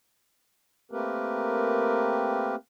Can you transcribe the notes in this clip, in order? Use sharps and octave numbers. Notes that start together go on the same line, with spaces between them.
A3 A#3 C4 G4 A#4 B4